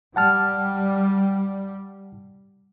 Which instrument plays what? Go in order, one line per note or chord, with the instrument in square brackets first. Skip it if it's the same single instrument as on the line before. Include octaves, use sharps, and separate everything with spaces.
[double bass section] G3 [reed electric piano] F#5 A5 F6